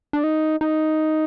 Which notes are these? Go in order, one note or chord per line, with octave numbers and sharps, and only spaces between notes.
D4
D#4
D#4